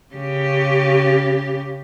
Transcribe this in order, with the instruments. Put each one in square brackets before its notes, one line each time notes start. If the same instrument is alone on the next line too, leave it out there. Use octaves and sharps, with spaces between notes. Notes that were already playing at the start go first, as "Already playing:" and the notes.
[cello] C#3 G4